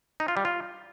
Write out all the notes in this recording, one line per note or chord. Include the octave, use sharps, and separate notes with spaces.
D#4
F4
G3
F4